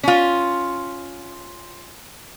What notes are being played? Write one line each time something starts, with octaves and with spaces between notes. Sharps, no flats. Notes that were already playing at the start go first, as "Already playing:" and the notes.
C#4 F4